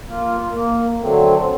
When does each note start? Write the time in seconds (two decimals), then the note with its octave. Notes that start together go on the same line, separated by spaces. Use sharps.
0.08 A#3 F4
0.51 A#3
1.01 D3 F#3 A3 C4